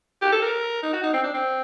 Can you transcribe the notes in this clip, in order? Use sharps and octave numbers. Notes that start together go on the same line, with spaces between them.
G4
A4
A#4
D#4
F#4
D#4
C4
D4
C4